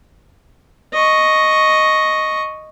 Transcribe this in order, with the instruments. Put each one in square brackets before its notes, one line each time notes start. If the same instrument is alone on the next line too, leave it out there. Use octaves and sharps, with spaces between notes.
[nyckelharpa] D#5 C#6